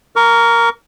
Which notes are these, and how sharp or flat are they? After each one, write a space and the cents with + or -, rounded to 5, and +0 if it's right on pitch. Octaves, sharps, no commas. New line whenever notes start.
A#4 +0 C#6 +40